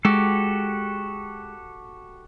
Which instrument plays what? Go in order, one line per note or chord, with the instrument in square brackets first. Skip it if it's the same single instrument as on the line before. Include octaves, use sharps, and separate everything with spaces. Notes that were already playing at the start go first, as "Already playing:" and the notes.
[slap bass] G#3 [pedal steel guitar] F#4 G4 A4